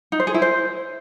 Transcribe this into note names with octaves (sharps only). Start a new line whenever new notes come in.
D#4
C5
G#4
E4
C5